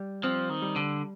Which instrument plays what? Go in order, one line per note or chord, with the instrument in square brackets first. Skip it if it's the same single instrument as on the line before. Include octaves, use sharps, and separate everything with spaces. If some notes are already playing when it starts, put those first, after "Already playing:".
Already playing: [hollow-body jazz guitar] G3
[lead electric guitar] F3 [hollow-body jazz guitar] C4
[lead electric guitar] D#3
[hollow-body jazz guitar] G3
[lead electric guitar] D3